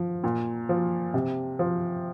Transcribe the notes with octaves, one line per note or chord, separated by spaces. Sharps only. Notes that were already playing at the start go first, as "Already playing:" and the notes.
Already playing: F3
A#2
F3
C3
F3